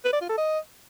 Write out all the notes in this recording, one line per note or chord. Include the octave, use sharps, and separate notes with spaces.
B4
D5
F4
A4
D#5